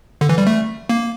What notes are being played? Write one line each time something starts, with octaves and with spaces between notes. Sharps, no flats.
D3
E3
G3
A3
A#3